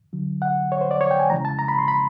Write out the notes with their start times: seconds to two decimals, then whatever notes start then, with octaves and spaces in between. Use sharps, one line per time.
0.13 D3 F#3
0.42 F#5
0.72 C#5
0.81 C5
0.91 D5
1.01 C#5
1.11 G5
1.20 G#5
1.30 C#3 E3 G#3 A#5
1.45 A5
1.59 A#5
1.68 B5
1.79 C6
1.88 B5